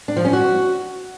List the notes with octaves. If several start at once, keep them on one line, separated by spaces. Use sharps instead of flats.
D4
F3
C#4
F#4